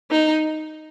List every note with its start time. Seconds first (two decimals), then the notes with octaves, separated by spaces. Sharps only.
0.11 D#4